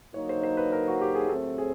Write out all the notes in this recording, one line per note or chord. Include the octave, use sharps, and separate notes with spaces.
D3 F#3 A#3 D#4 C#5
C5
C5
B4
A#4
F#4
G4
G#4
A2 F#3 A3 C4 A4
G#4